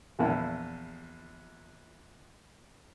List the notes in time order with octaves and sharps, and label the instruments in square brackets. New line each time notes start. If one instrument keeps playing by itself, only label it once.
[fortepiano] A#1 E2 E4